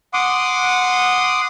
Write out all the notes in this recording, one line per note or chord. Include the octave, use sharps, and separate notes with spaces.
F#5 C6 D6 D#6